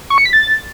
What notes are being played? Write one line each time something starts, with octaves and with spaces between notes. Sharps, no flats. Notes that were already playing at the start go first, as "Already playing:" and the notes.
C#6
C#7
B6
A6